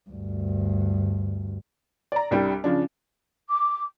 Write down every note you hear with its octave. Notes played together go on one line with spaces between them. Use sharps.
D2 G2
D5 A#5
C2 G3 D4 G4
C#3 F3 D4
D6